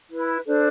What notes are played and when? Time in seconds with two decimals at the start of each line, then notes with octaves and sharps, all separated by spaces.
0.08 E4 B4
0.46 D4 A4 C5